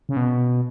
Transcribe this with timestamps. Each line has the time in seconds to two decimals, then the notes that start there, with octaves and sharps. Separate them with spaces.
0.09 C#3
0.17 B2